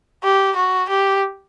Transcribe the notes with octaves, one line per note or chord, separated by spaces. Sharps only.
G4
F#4
G4